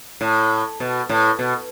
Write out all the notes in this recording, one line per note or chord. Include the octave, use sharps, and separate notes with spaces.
A2
B2
A2
B2